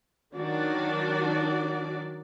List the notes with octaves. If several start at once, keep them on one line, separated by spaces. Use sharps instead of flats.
D#3 F#3 D4 F#4 D5